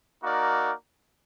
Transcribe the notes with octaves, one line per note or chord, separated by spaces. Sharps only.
A#3 D#4 F#4 A#4 D5